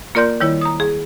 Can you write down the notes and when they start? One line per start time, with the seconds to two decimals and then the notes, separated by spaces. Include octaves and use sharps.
0.15 A#3 F4 A#4 D5 C6 G6
0.41 D#3 G3 E4 C#5
0.61 A#5 D#6
0.80 G#4